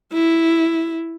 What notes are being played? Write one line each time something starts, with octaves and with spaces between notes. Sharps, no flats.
E4